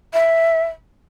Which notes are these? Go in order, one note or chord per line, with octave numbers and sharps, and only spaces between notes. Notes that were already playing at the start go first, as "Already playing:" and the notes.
E5